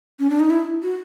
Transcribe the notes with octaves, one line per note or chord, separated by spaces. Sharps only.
C#4
D4
D#4
E4
F#4